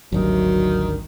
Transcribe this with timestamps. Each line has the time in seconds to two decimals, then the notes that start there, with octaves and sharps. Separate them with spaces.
0.12 G#1 D2 G2 D#3 F#3